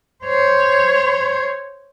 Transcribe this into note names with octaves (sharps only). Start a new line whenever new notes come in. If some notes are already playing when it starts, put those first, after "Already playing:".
C5 C#5